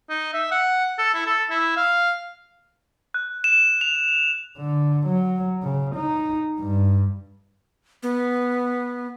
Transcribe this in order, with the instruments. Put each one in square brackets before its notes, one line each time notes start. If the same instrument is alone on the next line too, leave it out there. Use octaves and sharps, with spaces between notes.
[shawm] D#4
E5
F#5
A4
E4
A4
E4
F5
[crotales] F#6
E7
F7
[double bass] D3
F#3
C#3
D#4
G2
[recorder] B3